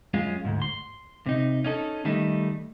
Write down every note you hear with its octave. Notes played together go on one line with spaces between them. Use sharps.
F#2 G#3 C#4 F4
D2 G#2
C6
C3 D#4
C#4 D#4 A4
D#3 G3 A3 D#4